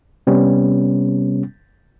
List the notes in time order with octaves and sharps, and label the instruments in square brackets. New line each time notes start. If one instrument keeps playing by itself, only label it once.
[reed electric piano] C3 G3 B3 C#4